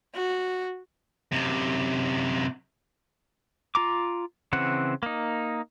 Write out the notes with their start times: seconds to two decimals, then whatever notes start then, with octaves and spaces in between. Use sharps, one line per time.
0.15 F#4
1.32 F#2 C3
3.75 F4 A#5 D6
4.53 C#3 E3 C4 F#5
5.03 A#3 D#4